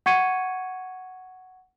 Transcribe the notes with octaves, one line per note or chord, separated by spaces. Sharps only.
F#5 C#6 G#6 C#7 D#7